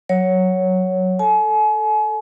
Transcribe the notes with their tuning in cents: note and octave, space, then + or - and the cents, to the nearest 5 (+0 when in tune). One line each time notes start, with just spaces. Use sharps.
F#3 +0 C#5 +0
A4 +0 G#5 +40